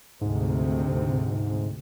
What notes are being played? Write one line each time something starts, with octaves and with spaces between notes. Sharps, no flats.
D2 G#2 C3